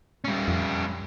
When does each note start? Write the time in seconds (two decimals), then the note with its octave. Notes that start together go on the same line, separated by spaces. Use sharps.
0.24 G3 C#4
0.48 F2